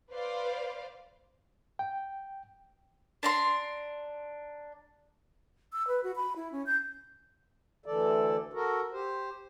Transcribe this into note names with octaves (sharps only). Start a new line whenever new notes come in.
B4 C5 D5 F5
G5
D4 A#5 C6
E6
B4
F#4
B5
E4
C#4
G6
D2 D3 E3 A4 D5
F#4 A4 A#4
G4 C5